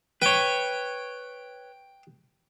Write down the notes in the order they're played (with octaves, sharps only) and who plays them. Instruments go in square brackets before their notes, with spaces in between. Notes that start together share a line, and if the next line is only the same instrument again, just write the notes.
[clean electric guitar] B4 C#5 [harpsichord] G5